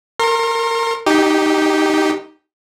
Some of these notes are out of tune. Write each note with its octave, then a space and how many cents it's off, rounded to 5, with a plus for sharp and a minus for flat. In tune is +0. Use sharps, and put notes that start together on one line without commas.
A#4 -20 C6 +35
D#4 +0 G4 -5